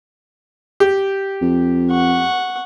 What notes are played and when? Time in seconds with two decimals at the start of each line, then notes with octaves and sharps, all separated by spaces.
0.80 G4
1.42 F2
1.91 F#5 C#6